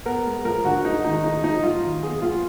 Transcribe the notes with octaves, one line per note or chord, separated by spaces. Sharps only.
B3 A#4
G#3
F3 A#4
D3 F#4
G#3 D#4
D#3 D#4
G#3 D#4
F3 D#4
F#3 F4
D#3
B3 G#4
F#3 F4